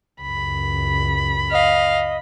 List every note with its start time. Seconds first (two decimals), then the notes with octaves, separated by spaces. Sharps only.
0.22 C#2 F#2 B5
1.51 D#5 F5